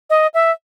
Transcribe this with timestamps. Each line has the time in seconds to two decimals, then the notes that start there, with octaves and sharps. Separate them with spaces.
0.10 D#5
0.34 E5